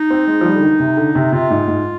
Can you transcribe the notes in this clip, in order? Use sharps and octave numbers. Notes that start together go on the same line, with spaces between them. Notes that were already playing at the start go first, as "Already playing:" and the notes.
Already playing: D#4
C4
G#3
F3
G3
D3
D#3
C3
D3
C3
C3 F4
G#2
G#2